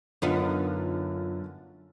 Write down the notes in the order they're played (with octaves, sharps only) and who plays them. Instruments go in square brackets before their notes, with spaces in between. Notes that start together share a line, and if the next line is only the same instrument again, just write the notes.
[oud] F#2 B3 D#4 [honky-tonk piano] D3 F4